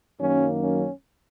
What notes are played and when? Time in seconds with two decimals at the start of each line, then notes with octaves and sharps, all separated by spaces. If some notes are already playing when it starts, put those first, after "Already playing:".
0.18 F#2 D#3 F#3 A#3 C#4
0.61 C#4